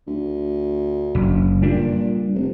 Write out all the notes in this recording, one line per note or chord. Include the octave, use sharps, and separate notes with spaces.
D2
F#1
A#2 G3 D4
F1